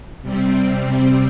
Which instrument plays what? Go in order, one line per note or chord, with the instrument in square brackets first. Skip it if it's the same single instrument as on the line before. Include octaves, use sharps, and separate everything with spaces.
[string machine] C3 G3 C4